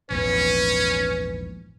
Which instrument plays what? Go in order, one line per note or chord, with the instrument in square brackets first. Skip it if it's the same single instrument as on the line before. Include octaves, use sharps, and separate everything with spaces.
[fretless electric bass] A#1 E2 G#2 [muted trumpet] C#4 [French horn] B4